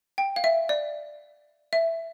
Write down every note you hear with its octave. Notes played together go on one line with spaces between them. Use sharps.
G5
F5
E5
D5
E5